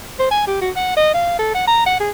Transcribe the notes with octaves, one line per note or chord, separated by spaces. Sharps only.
C5
G#5
G4
F#4
F#5
D#5
F5
A4
F#5
A#5
F#5
G#4